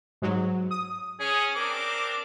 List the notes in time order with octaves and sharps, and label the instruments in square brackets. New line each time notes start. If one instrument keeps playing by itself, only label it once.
[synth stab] G#2 F#3
D#6
[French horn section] C#4 [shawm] G#4
[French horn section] C4 D4 A#4 [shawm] D6